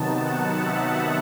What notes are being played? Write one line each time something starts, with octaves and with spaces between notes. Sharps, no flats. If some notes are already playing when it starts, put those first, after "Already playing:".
Already playing: C3 D#3 F#3 B3 D#4 A5
F#5
E5